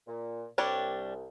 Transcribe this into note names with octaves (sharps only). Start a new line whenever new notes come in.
A#2
C2 G3 D4 C#5